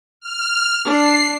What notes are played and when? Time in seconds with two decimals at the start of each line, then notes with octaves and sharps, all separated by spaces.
0.20 F6
0.86 D4 C7